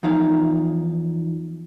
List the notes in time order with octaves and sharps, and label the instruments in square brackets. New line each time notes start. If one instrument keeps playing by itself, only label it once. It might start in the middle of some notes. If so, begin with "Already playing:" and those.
[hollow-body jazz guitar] E2 F3 D#4 F5